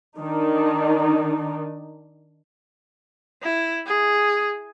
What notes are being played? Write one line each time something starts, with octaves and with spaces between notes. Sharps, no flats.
D#3 D4 D#4
E4
G#4